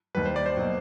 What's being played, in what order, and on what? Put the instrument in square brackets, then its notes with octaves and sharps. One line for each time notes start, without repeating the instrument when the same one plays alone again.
[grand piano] D#2 D#3 G3 [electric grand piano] B4
[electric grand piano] C5
D5
C5
[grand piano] B2 F#3 A#3 D#4